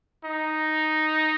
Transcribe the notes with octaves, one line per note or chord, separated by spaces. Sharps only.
D#4